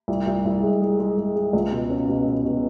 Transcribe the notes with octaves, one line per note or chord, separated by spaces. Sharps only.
C2
C2
C2
G#3
G#3
G#3
G#3
G#3
C#2
B2
C#4
B2
B2
B2